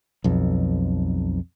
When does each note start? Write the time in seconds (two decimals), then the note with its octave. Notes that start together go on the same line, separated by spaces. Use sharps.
0.24 B1 F2